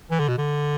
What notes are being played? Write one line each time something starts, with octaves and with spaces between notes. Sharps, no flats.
E3
D3
B2
D3